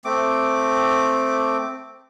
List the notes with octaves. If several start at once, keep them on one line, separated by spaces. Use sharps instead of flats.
A3 C4 D6